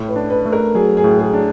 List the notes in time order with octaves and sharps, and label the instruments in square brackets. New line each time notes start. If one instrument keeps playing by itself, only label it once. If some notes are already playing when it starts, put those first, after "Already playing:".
Already playing: [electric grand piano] A2
[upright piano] B4
[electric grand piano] D4
[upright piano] B4
[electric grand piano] A3
[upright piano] A#4
[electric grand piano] F#3 [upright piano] G#4
[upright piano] G#4
[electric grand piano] A2
[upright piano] G#4
[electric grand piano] D4